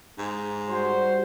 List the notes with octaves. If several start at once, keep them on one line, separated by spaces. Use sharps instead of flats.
G#2
G3 F#4 C5